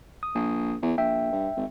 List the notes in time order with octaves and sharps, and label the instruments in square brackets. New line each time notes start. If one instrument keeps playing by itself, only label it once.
[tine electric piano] D#6
[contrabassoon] A#1
E2
[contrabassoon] A#1 [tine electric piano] E5 G5
[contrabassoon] G2
G#1